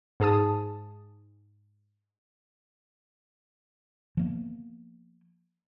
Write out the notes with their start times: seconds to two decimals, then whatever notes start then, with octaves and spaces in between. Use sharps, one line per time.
0.20 G#2 G#4 A5 D#6
4.17 F3 A#3 B3